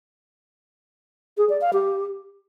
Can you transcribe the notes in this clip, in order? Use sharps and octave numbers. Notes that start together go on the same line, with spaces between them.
G#4
D5
F5
G4